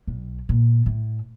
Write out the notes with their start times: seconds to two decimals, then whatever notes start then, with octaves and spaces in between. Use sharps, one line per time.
0.07 B1
0.49 A#2
0.86 A2